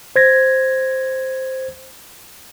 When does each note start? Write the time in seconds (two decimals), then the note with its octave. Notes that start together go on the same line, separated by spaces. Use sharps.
0.16 C5 G#6 A#6